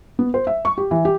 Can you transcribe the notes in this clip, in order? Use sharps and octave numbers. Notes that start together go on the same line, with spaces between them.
B3
C5
E5
C#6
G4
E3
G4